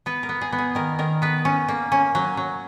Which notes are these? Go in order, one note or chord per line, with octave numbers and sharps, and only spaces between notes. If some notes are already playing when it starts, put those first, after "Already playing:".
B3 B4
A#4
B3
G#4
B3
G#4
D#3 A#4
D#3 A#4
B3 B4
C#4
A#3
C#4
F#3
F#3